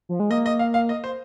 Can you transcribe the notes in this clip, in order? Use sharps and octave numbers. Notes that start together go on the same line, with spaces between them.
F3
G#3
A#3 D#5
D#5
F5
F5
D#5
C5